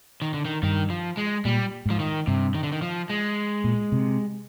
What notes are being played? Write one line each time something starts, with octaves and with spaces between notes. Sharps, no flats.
D#3
D3
D#3
G2 D#3
F3
G#3
A#2 G3
G#2 F3
D#3
G2 C3
D#3
D3
D#3
F3
G#3
A#2
C3